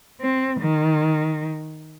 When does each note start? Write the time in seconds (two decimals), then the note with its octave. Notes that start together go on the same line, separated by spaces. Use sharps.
0.21 C4
0.60 D#3